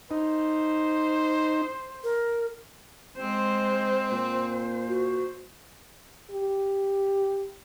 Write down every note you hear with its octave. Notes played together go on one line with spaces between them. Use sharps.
D#4 C5
A#4
G#3 C4 C5
A#2 C5
F#4
G4